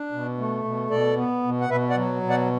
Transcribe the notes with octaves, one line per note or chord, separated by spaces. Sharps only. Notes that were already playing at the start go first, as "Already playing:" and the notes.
Already playing: D4
B2
A3
B2
B2 A4 D5
B3
B2
F#5
B2 B4 E5
D5 F#5
F#3
B2
D5 F#5